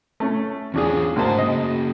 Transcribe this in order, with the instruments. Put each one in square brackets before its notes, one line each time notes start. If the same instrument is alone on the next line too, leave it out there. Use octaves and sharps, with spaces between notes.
[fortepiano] A3 C#4
[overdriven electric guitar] E2 F4 [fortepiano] C#4 D4 G#4
[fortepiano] D2 A#3 A5 [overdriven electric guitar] G#2 C5
[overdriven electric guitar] C#3 A#3 [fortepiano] D#5